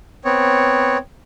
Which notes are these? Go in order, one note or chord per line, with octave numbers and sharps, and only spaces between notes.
B3 C4 C#5